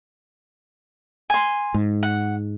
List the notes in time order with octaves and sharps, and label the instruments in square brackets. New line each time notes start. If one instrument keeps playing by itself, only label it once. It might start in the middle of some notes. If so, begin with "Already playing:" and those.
[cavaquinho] G#5 C6
[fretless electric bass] G#2
[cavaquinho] F#5